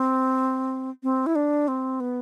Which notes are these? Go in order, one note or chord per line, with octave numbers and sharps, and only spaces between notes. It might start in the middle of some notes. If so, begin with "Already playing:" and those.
Already playing: C4
C4
E4
D4
C4
B3